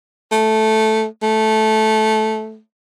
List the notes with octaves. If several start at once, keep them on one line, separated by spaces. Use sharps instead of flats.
A3
A3